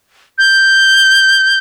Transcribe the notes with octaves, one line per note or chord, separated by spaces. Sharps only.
G6